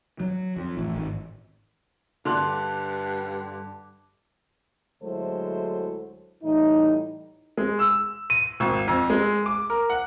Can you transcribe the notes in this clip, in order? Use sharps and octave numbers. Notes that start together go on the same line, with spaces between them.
F#3
F2
A1
G#1
G2 D3 D4 C6 F#6
D2 F#3 G#3 E4 A4 C5
A2 E3 G3 D#4
G#3
E6
D#7
G#1
F2
G#3
D6
A#4
F#5